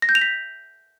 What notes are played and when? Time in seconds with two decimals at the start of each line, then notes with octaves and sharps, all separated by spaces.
0.02 A#6
0.09 G6
0.15 F7
0.21 B6